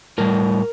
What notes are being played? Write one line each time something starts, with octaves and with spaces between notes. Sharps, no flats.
A2 G3 A#4